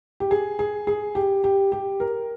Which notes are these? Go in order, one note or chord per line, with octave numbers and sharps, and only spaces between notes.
G4
G#4
G#4
G#4
G4
G4
G4
A#4